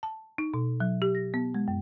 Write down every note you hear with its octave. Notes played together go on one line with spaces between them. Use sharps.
A5
D#4
B2
F#3
G4
A#6
B3
G#3
F#2